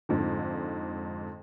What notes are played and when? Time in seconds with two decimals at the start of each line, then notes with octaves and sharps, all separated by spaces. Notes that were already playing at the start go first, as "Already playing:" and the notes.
0.09 F2 G#2 D3